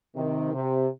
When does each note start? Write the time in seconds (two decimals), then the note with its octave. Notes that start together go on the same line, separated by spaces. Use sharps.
0.15 C3 D#3
0.53 C3